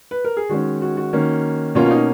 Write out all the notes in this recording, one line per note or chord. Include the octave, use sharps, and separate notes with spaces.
B4
A#4
G#4
D#3 G#3 C#4 F#4
F#4
F#4
D#3 A#3 C#4
B2 A#3 C#4 F4
F4
D#4